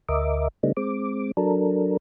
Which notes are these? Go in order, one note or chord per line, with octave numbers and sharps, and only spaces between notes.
D2 A#4 D#5 E5 D6
C#3 G3 A3 B3 D4 D#4
G#3 C4 D6
F#3 D4 A4 A#4